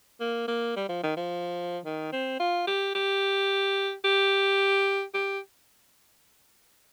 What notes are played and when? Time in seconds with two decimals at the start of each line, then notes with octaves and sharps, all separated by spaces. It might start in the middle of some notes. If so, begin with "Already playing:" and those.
0.20 A#3
0.47 A#3
0.76 G3
0.89 F3
1.03 D#3
1.17 F3
1.85 D#3
2.12 C4
2.39 F4
2.67 G4
2.95 G4
4.04 G4
5.14 G4